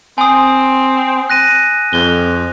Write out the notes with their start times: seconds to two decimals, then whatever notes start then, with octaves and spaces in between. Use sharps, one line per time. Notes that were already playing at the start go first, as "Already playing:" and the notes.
0.18 C4 G#5 D#6
1.30 F#6 A#6 D#7
1.93 F2 G7